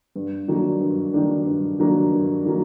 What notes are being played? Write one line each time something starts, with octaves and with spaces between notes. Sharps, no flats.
G2
D#3 F#3 A#3 D4
G2
D#3 F#3 A#3 D4
G2
D#3 F#3 A#3 D4
G2
D#3 F#3 A#3